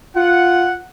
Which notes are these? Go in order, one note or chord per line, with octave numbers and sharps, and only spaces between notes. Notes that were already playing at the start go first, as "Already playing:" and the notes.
F4 F#5